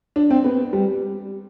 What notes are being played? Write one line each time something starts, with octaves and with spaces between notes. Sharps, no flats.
D4
C4
B3
G3